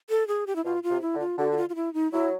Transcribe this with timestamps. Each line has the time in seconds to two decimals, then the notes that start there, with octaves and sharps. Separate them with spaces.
0.10 A4
0.28 G#4
0.47 G4
0.56 E4
0.65 B2 F4
0.83 F4
0.90 C3
1.02 E4
1.14 D3
1.20 F4
1.38 D3 F#4
1.52 F#4
1.57 F4
1.69 F4
1.75 E4
1.94 D#4
2.12 F#3 E4